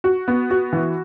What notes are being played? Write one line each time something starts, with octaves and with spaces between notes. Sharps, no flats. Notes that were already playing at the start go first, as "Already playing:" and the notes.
F#4
B3
F#4
E3